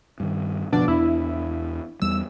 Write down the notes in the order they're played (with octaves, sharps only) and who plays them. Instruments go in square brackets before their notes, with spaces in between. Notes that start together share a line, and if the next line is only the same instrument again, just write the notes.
[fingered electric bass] G2 D#3
[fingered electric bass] F#1 F3 [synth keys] B2 D4 D5
[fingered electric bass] E2 C4 D4 [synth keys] E4
[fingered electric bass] E2 G3 [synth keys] E6